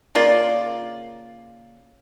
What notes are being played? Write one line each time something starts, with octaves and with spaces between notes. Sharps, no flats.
C#3 A#3 F4 D5